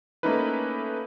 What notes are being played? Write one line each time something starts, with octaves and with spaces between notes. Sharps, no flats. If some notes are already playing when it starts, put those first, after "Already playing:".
A3 A#3 C#4 D#4 E4 B4